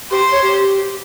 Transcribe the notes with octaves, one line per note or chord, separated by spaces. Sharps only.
G4 C5
C#5
G4